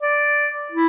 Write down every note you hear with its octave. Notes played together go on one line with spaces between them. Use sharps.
D5
E4